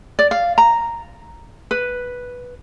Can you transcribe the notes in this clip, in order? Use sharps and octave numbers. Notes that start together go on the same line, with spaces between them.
D5
F5
A#5
B4